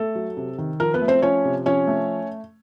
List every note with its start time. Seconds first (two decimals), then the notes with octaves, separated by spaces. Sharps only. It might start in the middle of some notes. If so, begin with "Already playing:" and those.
Already playing: A3 A4
0.15 F#3
0.37 C3
0.58 D#3
0.80 F3 A#4
0.94 B3 B4
1.01 A3
1.08 C4 C5
1.22 F3 C#4 C#5
1.45 C3
1.66 F3 C#4 C#5
1.87 A3